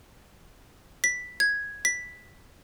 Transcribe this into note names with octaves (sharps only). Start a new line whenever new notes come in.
B6
G#6
B6